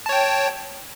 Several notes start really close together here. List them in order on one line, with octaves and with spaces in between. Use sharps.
A5 C#5 G5